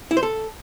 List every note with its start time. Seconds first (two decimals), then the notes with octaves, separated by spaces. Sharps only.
0.11 E4
0.17 C5
0.23 A4